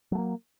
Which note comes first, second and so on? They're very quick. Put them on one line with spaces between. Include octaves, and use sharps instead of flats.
F#3 A3 A#3